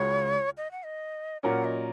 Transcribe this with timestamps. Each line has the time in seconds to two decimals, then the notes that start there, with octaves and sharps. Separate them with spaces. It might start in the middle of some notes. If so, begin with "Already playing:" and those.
Already playing: C#2 C#3 G#3 C#4 F#4 C#5
0.58 D#5
0.72 F#5
0.85 D#5
1.43 A#2 F#3 C#4 A#4 F#5
1.65 D#5